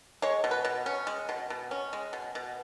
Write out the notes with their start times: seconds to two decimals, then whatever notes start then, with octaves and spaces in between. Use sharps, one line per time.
0.22 G#3 C#5
0.44 B2
0.51 B4
0.65 B2
0.86 C#4
1.07 G#3
1.29 B2
1.50 B2
1.71 C#4
1.93 G#3
2.13 B2
2.35 B2